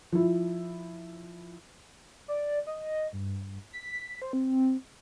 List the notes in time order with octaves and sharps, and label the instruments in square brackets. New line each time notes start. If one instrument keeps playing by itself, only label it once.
[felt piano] F3 E4
[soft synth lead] D5
D#5
G2
B6
C5
C4